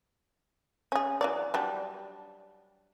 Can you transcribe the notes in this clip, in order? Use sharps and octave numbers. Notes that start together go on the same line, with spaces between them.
C#4 G#4
E3 F#3 D5
F#3 G3 D4